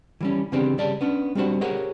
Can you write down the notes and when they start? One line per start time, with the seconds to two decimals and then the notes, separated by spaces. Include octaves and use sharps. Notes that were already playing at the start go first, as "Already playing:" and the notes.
0.21 E3 G3 C#4
0.52 C#3 E3 B3 C4 D4 G4
0.78 C#3 G3 D5 A5
1.01 B3 C#4 D4
1.35 G3 C4 D4 F#4 C5
1.61 G4 G#4 A#4 C5 C#5 F#5